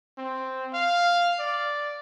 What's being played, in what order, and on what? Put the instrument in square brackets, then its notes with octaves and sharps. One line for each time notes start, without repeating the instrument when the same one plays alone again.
[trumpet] C4
F5
D5